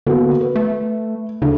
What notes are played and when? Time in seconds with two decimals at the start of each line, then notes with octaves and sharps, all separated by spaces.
0.07 D3 A#3 B3 F#4
0.41 B4
0.55 A3
1.42 D2 C#3